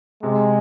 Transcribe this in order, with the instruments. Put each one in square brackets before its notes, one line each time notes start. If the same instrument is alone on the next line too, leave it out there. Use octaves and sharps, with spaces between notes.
[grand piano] C3 [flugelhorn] G#3